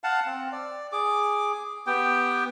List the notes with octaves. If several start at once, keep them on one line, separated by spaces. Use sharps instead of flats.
F5 F#5 A5
C4
D5
G#4 D6
B3 G4 G5